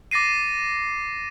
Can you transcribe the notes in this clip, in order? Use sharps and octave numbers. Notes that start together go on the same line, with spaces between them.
D6 A6 A#6 C7 D#7